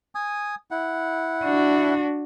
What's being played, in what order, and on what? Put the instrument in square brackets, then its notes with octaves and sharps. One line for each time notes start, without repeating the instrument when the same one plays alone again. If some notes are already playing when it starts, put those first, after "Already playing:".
[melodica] G#5 D#6
E4 F#5
[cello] D4 F#4